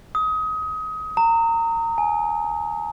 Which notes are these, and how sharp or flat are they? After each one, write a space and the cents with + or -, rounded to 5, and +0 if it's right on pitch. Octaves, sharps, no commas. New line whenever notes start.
D#6 +25
A#5 -25
G#5 +15